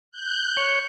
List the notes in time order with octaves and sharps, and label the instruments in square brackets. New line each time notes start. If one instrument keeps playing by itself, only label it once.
[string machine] F#6 G6
[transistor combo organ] C#5